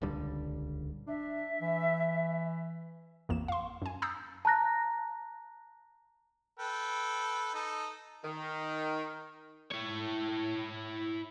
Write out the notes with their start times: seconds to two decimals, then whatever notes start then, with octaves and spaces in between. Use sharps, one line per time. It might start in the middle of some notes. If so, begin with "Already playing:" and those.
0.02 D#1 C#2 D3 G3
1.07 D4 E5
1.62 E3
3.29 A1 F2 A#3 E7
3.48 F5 C6
3.82 F#2 G#5
4.02 A#5 D#6 E6 G6 A6 C7
4.45 A5 A#5 F#6 A#6
6.59 A4 B4 G5
7.54 D#4 A4
8.24 D#3
9.71 E4 C#5